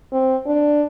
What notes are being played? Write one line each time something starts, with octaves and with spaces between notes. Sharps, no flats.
C4
D4